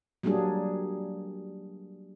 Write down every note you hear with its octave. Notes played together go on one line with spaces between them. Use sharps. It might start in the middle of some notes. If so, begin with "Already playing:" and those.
F#3 G3 A#3 D4 G#4